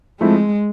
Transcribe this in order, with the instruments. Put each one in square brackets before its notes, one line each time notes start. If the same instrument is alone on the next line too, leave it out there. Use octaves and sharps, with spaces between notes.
[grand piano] F3 A3 C4 E4 [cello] G#3